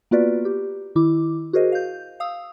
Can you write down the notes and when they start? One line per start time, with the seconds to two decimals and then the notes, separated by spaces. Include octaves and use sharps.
0.11 A#3 B3 F4 F#4 B4 D5
0.45 G4
0.95 D#3 E4 D6
1.53 F#4 G#4 A#4 C5 D#5
1.72 F5 G6
2.20 F5 D#6 E6